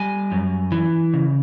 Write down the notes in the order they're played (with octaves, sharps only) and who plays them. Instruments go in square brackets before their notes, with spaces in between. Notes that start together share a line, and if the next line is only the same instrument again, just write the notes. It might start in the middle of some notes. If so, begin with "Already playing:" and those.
Already playing: [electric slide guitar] G3 G#5
F#2
E3
C#3